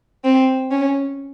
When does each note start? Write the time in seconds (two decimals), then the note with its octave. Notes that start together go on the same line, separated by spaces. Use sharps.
0.24 C4
0.71 C#4